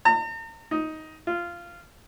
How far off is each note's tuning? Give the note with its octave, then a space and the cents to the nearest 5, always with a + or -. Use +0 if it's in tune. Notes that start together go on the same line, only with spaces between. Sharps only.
A#5 -45
D#4 +10
F4 -15